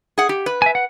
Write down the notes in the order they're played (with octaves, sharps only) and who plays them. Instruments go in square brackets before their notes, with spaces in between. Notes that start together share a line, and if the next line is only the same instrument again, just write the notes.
[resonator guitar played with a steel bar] G#4 F#5
G4
B4
[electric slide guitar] E5 G#5
F#5